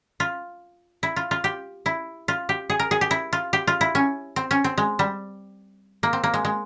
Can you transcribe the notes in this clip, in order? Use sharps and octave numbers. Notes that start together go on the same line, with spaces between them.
F4
E4
F4
F4
G4
E4
F4
G4
G#4
A#4
G#4
G4
E4
F4
G4
F4
E4
C#4
C4
C#4
C4
G#3
G3
A#3
C4
A#3
G#3
G#3